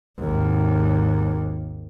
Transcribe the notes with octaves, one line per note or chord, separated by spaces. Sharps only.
G#1 D#2